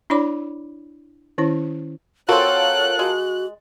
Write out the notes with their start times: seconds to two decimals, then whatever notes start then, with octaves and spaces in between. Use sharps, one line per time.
0.10 D4 E4 C#5 D5 B5 D6
1.38 D#3 C#4 E4 C#5
2.29 C4 F4 F#4 A4 A#4 C#5 F#6
2.99 G#3 F#4